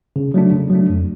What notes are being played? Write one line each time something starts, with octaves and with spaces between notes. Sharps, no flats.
C#3
F#3 A3 D4
C#3
F#3 A3 D4
F2